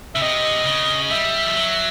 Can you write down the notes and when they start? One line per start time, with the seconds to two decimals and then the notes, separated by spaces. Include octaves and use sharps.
0.15 C#3 E5
0.22 C3 D#5
0.66 C#3
1.10 G3 E5
1.46 F3
1.54 F#3